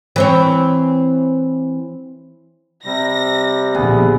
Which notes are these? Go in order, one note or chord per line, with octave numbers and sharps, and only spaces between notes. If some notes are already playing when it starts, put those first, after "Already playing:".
E3 C4 C#5
C3 G3 A#6
A#1 B2 D3 B3 G#4